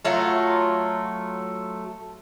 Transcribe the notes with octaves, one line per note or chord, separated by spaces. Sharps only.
F#3 A3 F4